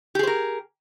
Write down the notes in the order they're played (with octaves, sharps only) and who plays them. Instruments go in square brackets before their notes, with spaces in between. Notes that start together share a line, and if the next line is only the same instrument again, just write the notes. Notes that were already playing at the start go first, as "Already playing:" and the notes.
[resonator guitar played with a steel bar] G4
G#4
C5
A#4